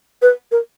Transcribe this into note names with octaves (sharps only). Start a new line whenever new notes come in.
B4
A#4